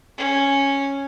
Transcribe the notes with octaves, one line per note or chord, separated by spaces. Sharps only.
C#4